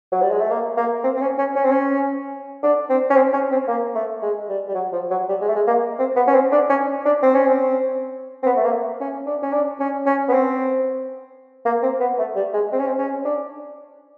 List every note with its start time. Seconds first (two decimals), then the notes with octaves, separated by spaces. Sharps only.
0.12 F#3
0.22 G3
0.31 G#3
0.41 A3
0.50 A#3
0.77 A#3
1.04 C4
1.16 C4
1.21 C#4
1.38 C#4
1.56 C#4
1.64 C4
1.71 C#4
2.63 D4
2.89 C4
3.10 C#4
3.16 C4
3.33 C#4
3.51 C4
3.68 A#3
3.95 A3
4.22 G#3
4.49 G3
4.68 G3
4.74 F#3
4.92 F3
5.10 F#3
5.29 G3
5.41 G#3
5.49 A3
5.55 G#3
5.67 A#3
5.99 C4
6.16 B3
6.27 C#4
6.34 C4
6.52 D4
6.69 C#4
7.06 D4
7.22 C4
7.34 C#4
7.46 C4
8.43 C4
8.46 B3
8.57 A3
8.65 A#3
9.00 C#4
9.26 D4
9.43 C#4
9.53 D4
9.80 C#4
10.06 C#4
10.28 B3
10.33 C4
11.65 A#3
11.83 C4
12.00 B3
12.19 A3
12.36 G3
12.54 G#3
12.72 C4
12.79 C#4
12.86 C4
12.98 C#4
13.25 D4